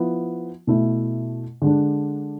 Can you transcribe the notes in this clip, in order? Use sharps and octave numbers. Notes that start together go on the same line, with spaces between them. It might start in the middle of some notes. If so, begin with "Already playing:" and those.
Already playing: F3 B3 E4
B2 A3 E4
D3 G#3 D4